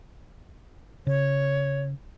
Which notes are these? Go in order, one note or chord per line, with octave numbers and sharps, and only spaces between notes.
C#3 C#5